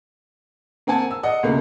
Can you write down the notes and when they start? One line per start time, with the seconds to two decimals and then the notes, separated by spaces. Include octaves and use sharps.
0.87 A#3 C4 F#5 G#5 A5
1.11 E6
1.23 D5 D#5 F#5
1.43 C#2 B2 A3 A#3